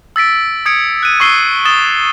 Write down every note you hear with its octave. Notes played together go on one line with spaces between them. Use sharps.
E6 A6 B6 D7
D#6 G#6 C#7 D7
F#6 D#7
C#6 E6 C7 G7
D#6 A6 E7 G7